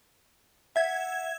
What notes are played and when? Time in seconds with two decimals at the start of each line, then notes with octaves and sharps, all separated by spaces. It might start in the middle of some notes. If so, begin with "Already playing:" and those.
0.76 E5 F#5 G#6